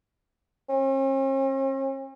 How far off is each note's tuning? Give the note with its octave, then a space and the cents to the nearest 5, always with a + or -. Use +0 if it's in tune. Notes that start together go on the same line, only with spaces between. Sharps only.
C#4 -45